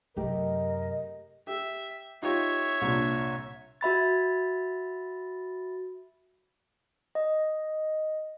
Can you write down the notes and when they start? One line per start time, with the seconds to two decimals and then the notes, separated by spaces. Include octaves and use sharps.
0.17 F#2 C3 A3 G4 A#4 D#5
1.47 G4 E5
2.22 D#4 F4 G4 C#5 E5
2.81 C2 A#2 D4
3.81 F#4 E5 B5 A6
7.15 D#5